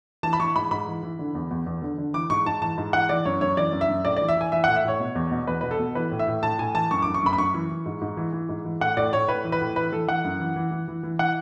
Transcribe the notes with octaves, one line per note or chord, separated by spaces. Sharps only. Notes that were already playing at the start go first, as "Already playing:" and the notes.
E3 A5
B5
E3 C#6
G#2 B5
G#2 B5
E3
E3
D3
E2
E2
E2
D3
D3
E3 D6
G#2 C#6
G#2 A5
E3 A5
G#2
E3 F#5
E3 D5
F#2 C#5
F#2 C#5
E3 D5
F#2
E5
F#2
A2 D5
E3 D5
E5
E3 G#5
E3 E5
A2 F#5
E5
A2 C#5
B2
E2
B2
E2 B4
B2 B4
A4
B2
E3 B4
A2
E5
A2
A2 A5
A2 G#5
E3 A5
F#2 C#6
F#2 D6
C#6
F#2 B5
B5
F#2 C#6
E3
E3
G#2
G#2
E3
E3
G#2
E3
A2 F#5
A2 D5
A2 C#5
A2 B4
E3
B4
A2
E3 B4
E3 A4
E3 F#5
F#2
E3
E3
E3
E3
E3
E3 F#5